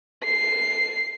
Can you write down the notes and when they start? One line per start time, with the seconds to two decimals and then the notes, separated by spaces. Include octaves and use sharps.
0.24 C7